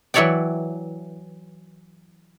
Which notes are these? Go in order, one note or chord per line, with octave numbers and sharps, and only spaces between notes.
E3 F#3 E4 C#5 D5 G5